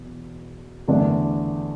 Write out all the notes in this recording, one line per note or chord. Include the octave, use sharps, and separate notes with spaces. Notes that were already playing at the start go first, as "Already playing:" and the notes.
Already playing: E2 B2
E2 D3 A3 D4